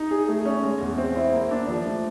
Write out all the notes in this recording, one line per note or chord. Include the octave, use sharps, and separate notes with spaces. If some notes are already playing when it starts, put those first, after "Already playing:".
Already playing: D#4
G#4
A3
C#4
G#3
E2
C4
E4
A#3
D4
F3
A3